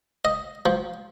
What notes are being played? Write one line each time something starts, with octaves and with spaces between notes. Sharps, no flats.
D#5
F3